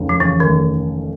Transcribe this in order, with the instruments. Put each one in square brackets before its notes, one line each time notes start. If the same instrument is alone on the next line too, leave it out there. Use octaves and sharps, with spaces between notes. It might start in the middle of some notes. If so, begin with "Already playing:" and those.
Already playing: [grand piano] F1 D#2 C#3
[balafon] F3
[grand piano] C#3 [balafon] E3
[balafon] D#3
[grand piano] F1